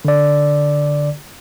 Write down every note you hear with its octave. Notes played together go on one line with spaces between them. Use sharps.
D3 D5